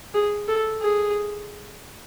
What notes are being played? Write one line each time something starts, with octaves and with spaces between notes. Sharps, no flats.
G#4
A4
G#4